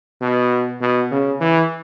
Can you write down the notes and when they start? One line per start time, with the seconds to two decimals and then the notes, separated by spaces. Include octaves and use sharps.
0.21 B2
0.81 B2
1.11 C#3
1.41 E3